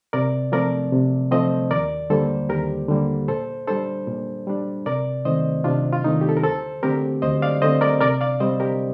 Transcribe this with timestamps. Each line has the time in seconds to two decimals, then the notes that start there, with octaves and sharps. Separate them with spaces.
0.13 C3 A#4 D5
0.52 F3 A3 C4 A#4 D5
0.92 C3
1.31 F3 A3 C4 C5 D#5
1.71 D#2 A#4 D5
2.10 D3 G3 A#3 A4 C5
2.49 D#2 G4 A#4
2.89 D3 G3 A#3
3.28 A#2 A4 C5
3.67 G3 D4 A4 C5
4.07 A#2
4.47 G3 D4
4.86 C3 A#4 D5
5.25 D#3 A3 C4 C5 D#5
5.64 C3 D4 F4
5.93 F4
6.04 D#3 A3 C4 D#4
6.21 G4
6.29 A4
6.37 A#4
6.43 D2 A4 C5
6.83 D3 A3 C4 G4 A#4
7.22 D2 C5 D#5
7.42 D5 F5
7.62 D3 A3 C4 C5 D#5
7.81 A#4 D5
8.01 C3 A#4 D5
8.21 D5 F5
8.40 G3 C4 C5 D#5
8.60 G4 A#4